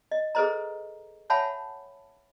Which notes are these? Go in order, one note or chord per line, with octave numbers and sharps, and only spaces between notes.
D#5
G#4 A4 B4 C5 D#5 A#5
C#5 E5 F#5 G#5 A5 B5